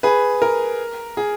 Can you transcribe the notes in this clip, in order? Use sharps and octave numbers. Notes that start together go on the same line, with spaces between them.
G#4 B4
A#4
G#4